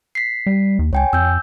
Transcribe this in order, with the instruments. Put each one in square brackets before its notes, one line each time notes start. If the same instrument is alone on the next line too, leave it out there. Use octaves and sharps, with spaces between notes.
[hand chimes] B6 C7
[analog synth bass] G3
D#2
[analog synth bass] C#2 [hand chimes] C#5 G5 G#5
[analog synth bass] F2 [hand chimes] E6 G6